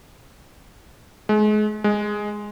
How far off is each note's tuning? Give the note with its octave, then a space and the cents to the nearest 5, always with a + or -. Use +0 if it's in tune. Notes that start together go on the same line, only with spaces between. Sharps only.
G#3 +35
G#3 +0